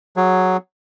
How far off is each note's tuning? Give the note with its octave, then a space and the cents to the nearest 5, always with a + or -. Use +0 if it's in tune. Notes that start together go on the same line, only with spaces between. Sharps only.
F#3 +0 G#4 +0